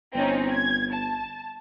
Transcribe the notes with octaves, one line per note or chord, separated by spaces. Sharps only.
G1 C4 C#4 D#4
G#6
A5